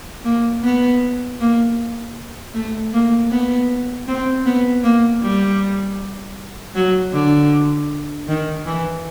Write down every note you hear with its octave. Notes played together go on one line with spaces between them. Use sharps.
A#3
B3
A#3
A3
A#3
B3
C4
B3
A#3
G3
F#3
D3
D#3
E3